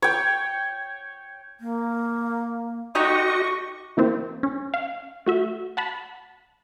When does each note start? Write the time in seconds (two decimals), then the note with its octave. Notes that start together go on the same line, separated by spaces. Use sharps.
0.02 C#5 G5
1.60 A#3
2.95 D3 D#4 F#4 G4 D#5 C#6
3.97 E3 A#3 C4 C5
4.43 C#4
4.74 F5
5.26 A3 F#4 E5
5.77 F#5 A5 B5